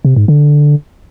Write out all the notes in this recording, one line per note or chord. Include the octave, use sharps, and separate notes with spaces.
C3
G#2
D3